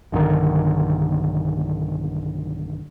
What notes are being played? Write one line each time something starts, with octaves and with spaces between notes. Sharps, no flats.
B1 G2 D3 D#3